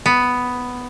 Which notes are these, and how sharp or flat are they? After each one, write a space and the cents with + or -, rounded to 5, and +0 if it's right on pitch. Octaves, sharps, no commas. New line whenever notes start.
B3 +5